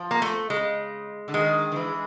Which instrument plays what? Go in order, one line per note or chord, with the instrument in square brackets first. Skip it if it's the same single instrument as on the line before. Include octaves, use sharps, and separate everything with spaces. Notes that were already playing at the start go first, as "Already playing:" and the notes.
Already playing: [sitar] F3
[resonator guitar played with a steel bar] A#3
A3
[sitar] C#3 [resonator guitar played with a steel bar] G#3
[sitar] D3
[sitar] D#3 [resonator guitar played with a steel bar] G#3
[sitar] D#3
E3